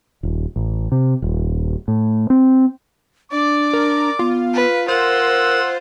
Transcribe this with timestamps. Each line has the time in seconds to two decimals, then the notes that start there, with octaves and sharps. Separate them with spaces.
0.23 D#1
0.56 A1
0.92 C3
1.22 D#1
1.88 A2
2.30 C4
3.32 D4 D5 D6
3.73 A#4
4.19 B3 F4
4.54 B4
4.88 F4 A#4 C5 F#5 E6